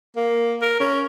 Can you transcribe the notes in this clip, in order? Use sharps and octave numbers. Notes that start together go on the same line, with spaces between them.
A#3
A#4
C#4